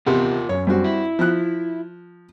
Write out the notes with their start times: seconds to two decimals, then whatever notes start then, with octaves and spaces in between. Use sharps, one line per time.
0.06 E2 C3 F4 A#4 F#5
0.49 F#2 C#5
0.67 G2 C4 F#4
0.84 E4
1.19 F3 F#6